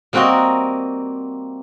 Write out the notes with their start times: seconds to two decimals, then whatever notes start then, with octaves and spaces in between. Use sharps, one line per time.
0.13 G3 A#3 C4 F#4 A#4 D#5